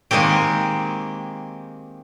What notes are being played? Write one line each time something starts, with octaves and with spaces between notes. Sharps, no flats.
D#3 G#3 A#3 C4 G4